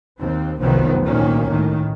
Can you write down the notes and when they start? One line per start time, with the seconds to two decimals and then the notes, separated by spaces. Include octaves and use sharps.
0.19 D#2 C4
0.61 F1 C2 F#2 D#3 F3 B3
1.03 D2 A#2 D#3 A#3 C#4
1.49 A2 D#3